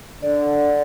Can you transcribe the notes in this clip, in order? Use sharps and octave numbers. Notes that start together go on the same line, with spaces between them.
D3 D5